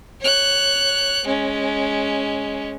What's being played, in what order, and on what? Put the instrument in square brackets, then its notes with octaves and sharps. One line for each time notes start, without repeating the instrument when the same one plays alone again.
[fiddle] C#5 F#6
G#3 C#4